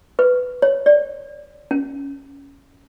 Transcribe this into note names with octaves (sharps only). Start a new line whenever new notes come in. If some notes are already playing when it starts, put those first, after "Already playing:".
B4
C#5
D5
C#4